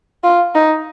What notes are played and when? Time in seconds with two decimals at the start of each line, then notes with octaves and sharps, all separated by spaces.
0.24 F4
0.55 D#4